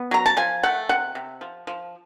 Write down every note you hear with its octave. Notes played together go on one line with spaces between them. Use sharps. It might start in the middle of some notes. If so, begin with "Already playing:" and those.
Already playing: B3
F#3 A#5
A5
F3 G#5
A3 F#5
C3 F#5
C3
F3
F3